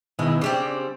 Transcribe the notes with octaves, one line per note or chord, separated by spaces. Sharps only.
B2 D#3 G#3 E4
C#3 G3 C4 D4